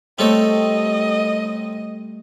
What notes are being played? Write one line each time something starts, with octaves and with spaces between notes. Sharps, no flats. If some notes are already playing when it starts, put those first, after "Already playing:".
G3 A3 C4 A4 C#5 D#5